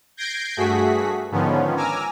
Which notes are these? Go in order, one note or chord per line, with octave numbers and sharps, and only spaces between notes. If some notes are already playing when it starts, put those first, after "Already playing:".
G6 G#6 A#6 C7 D7
G2 A3 F#4 G#4 B6
G#2 D3 D#3 F3 B3 C#4
G#5 A#5 D6 E6 F6